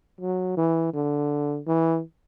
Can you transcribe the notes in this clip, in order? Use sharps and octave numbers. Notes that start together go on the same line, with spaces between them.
F#3
E3
D3
E3